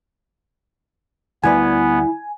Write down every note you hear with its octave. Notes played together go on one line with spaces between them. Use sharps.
D2 G3 B3 E4 B4 G#5